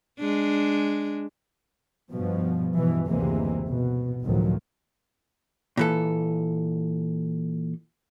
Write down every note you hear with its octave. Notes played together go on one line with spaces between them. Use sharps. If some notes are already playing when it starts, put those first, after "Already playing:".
G#3 D4
G2 B2 F3
G2 B2 E3
F#1 D2 C3 E3 G#3 A#3
B2
G1 C#2 A2 D#3 F3 F#3
A#2 E3 A4